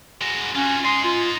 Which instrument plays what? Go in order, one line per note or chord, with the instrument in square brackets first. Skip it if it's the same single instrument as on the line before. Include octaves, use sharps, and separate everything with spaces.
[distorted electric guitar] G#3 F#4
[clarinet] C#4 [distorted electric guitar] F4 F#4
[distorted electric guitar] D#4 G#5 [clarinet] C6
[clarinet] F4